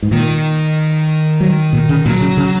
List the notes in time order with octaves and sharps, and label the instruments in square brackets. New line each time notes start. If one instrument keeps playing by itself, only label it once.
[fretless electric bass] G#2
[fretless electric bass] A#2 [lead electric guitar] D#3
[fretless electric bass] F#3
A#2
C#3
[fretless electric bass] A#2 [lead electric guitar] F#3
[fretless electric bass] C#3
C#3